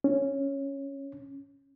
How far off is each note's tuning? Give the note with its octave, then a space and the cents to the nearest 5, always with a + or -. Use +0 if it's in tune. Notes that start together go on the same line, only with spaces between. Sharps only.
C#4 -5